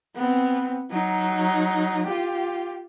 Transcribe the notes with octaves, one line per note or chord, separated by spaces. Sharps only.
B3 C4
F#3 D#4
F4 G4